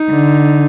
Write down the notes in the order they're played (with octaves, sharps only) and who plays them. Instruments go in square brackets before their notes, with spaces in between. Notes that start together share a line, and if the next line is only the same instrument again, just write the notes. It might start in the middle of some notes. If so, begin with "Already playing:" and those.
Already playing: [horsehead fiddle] D#4
[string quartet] D3